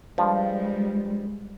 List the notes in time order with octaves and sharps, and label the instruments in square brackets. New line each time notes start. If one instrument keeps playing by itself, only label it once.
[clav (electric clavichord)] G2 F3 [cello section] G3 G#3